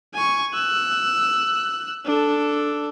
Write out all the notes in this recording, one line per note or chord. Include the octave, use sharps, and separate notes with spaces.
G#5 C#6
E6 F#6
D4 A4